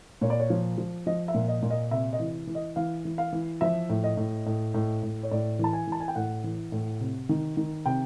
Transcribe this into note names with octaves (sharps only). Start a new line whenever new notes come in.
A#2 C#5
D5
C#5
F3
F3
F3 D#5
E5
A#2
D#5
A#2
D#5
C3 E5
D#5
E3
E3
D#5
E3 F5
E3
F5
E3
F3 E5
A2
D#5
A2
A2
A2
A2
C#5
A2 D5
E3 A5
G#5
E3 A5
G#5
G5
A2 F#5
E3
A2
C3
D#3
D#3
C3 G5